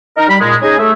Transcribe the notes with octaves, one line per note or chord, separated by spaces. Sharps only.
D#4 A#4
G3 B5
A#2 G#3
C#4 D#4 G#4 D#5 G#5
A3 E5